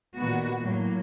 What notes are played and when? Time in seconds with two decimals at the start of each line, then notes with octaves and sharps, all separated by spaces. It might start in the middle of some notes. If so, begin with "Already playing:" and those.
0.15 A#2 D#3 B3 F#4
0.61 A2 F#3 A#3